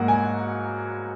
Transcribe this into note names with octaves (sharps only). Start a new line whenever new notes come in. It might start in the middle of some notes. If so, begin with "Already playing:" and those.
Already playing: G#2 F#3 A#3 F#5
G#5